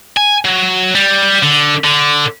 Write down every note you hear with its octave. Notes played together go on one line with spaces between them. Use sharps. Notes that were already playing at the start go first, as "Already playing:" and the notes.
G#5
F#3
G3
D3
D3